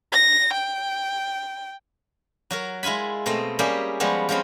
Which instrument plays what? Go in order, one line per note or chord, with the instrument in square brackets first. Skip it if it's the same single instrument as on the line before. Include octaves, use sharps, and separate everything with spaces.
[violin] A#6
G5
[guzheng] F#3 F#4 A#4
G#3 E4 F4 G#5 B5
B2 A3 C4 D#5
G3 A#3 C#4 G4 G#4 E5
F3 G3 G#3 B3 C#5
F3 G#3 C4 C#4